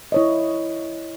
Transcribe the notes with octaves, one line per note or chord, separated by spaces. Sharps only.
E4 C#5 D#5